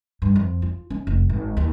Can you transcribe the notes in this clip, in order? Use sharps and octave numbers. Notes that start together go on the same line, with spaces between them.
G2
F2
F4
C#4
F1
G#1
D#2